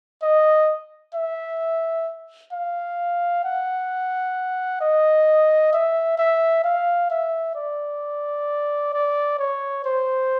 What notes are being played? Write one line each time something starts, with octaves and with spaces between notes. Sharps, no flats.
D#5
E5
F5
F#5
D#5
E5
E5
F5
E5
D5
D5
C#5
C5